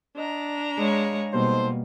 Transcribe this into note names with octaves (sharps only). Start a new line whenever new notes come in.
D4 C5 D#5 F#5 A#5
G#3 G#4 B4 C#5 F5
B2 G3 A#3 B3 D#4 A4 C5